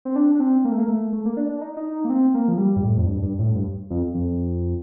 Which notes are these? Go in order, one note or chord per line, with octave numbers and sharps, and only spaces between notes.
C4
D4
D4
C4
A#3
A3
A#3
A3
A3
A#3
D4
D4
D#4
D#4
A#3
C4
A#3
F3
G3
G2
A2
F2
G2
G2
A2
G2
F2
F2